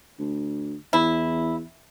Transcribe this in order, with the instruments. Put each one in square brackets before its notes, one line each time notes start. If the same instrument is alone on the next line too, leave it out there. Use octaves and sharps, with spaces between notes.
[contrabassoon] D2
[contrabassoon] E2 [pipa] E4